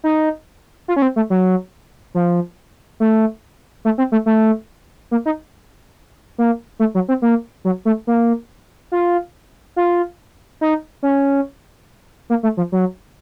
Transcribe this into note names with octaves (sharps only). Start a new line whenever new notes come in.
D#4
F4
C#4
C4
A3
F#3
F3
A3
A3
C4
A3
A3
A#3
D#4
A#3
A3
F#3
C4
A#3
F#3
A3
A#3
F4
F4
D#4
C#4
A#3
A3
F3
F#3